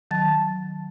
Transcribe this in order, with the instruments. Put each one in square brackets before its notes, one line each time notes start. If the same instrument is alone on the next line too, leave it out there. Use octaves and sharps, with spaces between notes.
[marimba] D#3 F#3 A5 A6